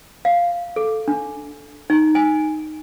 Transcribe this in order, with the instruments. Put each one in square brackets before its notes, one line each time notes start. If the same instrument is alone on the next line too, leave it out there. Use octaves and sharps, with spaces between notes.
[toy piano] F5
A4
D4
D#4
G#5